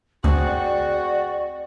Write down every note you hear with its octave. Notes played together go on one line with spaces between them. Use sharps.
D2 C4 F#4 G#4 D5